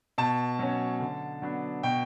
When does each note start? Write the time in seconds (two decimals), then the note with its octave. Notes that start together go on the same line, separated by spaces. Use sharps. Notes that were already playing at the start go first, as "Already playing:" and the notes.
0.18 B2 A5
0.59 F#3 C#4
1.00 D3
1.42 F#3 B3 D4
1.83 B2 G5